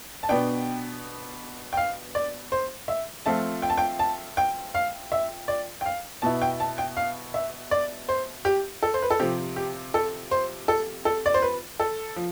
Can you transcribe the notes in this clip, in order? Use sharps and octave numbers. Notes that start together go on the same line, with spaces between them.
A5
B2 B3 D4 G5
G5
F5
D5
C5
E5
F3 A3 C4 F4 A5
G5
A5
G5
A5
G5
F5
E5
D5
G5
F5
B2 B3 E4 A5
G5
A5
G5
F5
E5
D5
C5
G4
A4
C5
B4
A4
C3 F3 C4 G4
G4
A4
C5
A4
A4
D5
C5
B4
A4
F3